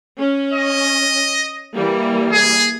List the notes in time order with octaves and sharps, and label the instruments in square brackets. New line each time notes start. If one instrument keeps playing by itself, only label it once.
[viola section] C#4
[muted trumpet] D#5
[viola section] E3 G3 A#3
[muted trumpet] G#4